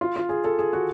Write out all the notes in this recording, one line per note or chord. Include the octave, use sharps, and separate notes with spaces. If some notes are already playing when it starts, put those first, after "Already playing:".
F4
F4
G#4
A4
G#4
F#4